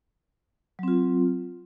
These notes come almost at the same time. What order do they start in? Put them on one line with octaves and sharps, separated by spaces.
F#3 C4 F4